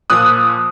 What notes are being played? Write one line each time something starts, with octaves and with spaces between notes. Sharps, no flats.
A#2 F3 D#6 F#6